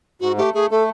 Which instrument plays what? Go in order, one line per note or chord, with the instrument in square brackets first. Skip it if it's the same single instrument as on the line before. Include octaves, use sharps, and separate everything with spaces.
[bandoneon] G#2 [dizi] F#4
[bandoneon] A3 [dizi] G4
[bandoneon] A3 [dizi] G#4
[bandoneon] A3 [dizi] A4